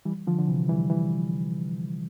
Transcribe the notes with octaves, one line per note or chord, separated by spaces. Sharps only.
E3 G3
D3 F3
D3
C3 E3
E3 G3
E3 G3